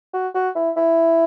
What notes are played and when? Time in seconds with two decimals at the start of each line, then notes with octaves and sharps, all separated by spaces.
0.13 F#4
0.35 F#4
0.55 E4
0.77 E4